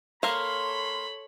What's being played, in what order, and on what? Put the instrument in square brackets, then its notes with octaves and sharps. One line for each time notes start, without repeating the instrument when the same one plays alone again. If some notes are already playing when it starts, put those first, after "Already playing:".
[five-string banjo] A#3 A#4 F5 [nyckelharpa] A4 C#5 [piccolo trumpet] B5 [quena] C6